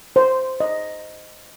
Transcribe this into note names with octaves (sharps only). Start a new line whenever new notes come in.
C5
D#5